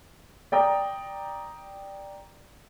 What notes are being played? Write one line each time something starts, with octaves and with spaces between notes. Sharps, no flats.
D5 G5 A#5 D#6